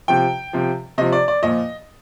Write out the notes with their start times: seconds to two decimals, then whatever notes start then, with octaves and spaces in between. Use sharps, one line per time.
0.08 C3 F3 G5
0.53 C3 F3
0.98 C3 F3 D#5
1.12 D5
1.28 D5
1.42 A#2 F3 D#5